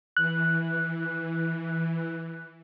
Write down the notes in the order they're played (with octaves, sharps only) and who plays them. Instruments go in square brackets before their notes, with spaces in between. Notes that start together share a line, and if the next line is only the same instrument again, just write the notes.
[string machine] E3 [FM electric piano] F#6